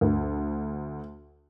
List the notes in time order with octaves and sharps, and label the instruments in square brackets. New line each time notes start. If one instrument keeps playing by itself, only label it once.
[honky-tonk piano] D2